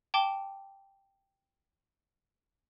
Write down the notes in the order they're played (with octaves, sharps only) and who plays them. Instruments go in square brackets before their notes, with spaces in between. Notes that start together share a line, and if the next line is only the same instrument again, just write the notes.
[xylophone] G5 A5 D6 G7